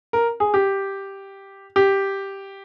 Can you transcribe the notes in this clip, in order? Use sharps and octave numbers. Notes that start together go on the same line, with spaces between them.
A#4
G#4
G4
G4